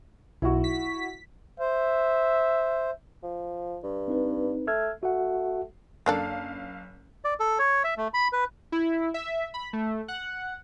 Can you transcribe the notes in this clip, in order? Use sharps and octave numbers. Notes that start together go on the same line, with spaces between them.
B1 E4 F#4
B6
C5 E5
F3
G2
C4 D#4 B4
A3 E6 F6 G#6
A3 F#4 F#5
F#1 A#3 D4 A4 F5
D5
A4
C#5
E5
A3
B5
B4
E4
E5
B5
A3
F#5